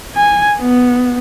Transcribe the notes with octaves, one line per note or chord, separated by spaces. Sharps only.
G#5
B3